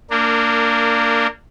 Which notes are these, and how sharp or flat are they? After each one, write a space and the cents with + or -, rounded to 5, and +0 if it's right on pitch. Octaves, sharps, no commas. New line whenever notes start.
A#3 -15 D4 +0 A#4 -30